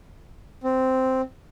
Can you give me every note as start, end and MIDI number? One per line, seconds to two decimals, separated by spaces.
0.64 1.21 60